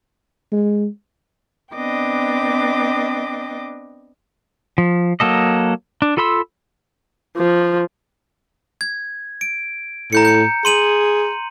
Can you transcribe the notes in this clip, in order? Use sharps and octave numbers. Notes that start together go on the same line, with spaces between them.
G#3
B3 C4 D4 D#5 G5 D6
F3
F#3 A#3 A4 D#5
D4
F4 A4 B5 C6 E6
F3
G#6
D7
A2 A#5 G6 C#7
G6 C#7
G#4 C6 D#7 F#7